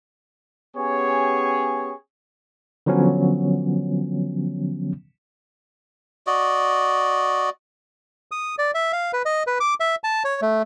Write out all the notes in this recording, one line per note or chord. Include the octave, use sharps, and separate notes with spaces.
B3 C#4 G4 G#4 C#5
D3 F3 F#3 B3 C#4
F#4 D5 D#5
D#6
D5
E5
F5
B4
D#5
B4
D6
E5
A5
C#5
A3